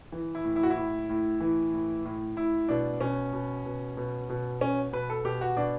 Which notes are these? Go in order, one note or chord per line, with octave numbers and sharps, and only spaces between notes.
E3
E4
A2
E4
F#4
E4
A2
A2
E3
A2
A2
A2 E4
B2 D4
B2 C#4
B2
B2
B2
B2
B2 C#4
B2 B4
A4
B2 G4
F#4
B2 D4